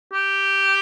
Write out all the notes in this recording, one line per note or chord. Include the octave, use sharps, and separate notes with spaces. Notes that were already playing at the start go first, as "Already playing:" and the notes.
G4